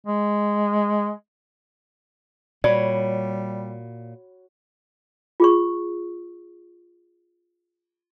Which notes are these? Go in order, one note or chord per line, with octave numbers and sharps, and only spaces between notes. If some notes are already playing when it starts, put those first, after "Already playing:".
G#3
A#2 G3 F#4 C#5 D5 B5
F4 G#4 C#6